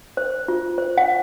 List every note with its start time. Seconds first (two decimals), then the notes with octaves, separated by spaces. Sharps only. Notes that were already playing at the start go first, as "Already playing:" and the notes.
0.17 C5
0.48 F4
0.78 C5
0.98 F#5